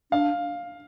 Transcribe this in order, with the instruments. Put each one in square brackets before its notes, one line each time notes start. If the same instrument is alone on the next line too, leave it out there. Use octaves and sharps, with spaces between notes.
[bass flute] D4 [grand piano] F5